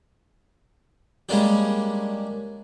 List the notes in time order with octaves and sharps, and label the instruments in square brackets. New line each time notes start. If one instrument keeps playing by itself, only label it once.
[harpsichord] G3 G#3 A#3 C#4 D4 G4